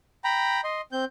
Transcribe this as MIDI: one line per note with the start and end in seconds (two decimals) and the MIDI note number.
0.24 0.61 79
0.24 0.61 82
0.24 0.61 83
0.64 0.81 75
0.64 0.81 84
0.92 1.05 60
0.92 1.05 91